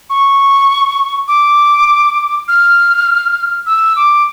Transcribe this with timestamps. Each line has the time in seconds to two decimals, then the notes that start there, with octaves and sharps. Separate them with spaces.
0.10 C#6
1.28 D6
2.48 F6
3.66 E6
3.96 D6